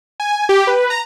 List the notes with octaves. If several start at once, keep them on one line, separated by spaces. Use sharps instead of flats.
G#5
G4
B4
A#5